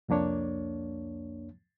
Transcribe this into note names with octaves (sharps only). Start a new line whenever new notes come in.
C2 F2 A#3 D4 C#5